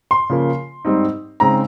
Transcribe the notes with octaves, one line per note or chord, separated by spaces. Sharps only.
C6
C#3 F3 A#3
G#2 G3 C4 D#4
C#3 G#3 C4 D#4 A#5